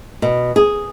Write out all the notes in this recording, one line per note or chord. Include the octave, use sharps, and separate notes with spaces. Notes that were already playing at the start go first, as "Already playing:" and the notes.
B2
G#4